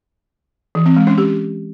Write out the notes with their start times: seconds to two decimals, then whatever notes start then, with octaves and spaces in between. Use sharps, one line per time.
0.75 E3
0.86 C4
0.96 G#3
1.07 C#4
1.18 G4